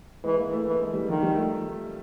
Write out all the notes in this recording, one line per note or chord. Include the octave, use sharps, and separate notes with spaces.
E3 G#3
A#3
A3
E3
G#3
G3
D#3 F3
G3
A3